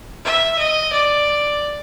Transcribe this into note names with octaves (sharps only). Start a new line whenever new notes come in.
E5
D#5
D5